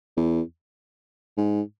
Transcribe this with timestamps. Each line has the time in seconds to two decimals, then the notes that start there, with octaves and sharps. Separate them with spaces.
0.17 E2
1.37 G#2